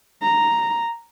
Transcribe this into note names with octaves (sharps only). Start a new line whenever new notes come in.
A#5